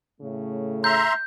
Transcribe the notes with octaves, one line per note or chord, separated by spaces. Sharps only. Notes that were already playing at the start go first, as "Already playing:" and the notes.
A2 C#3 A3
E5 A#5 C6 G6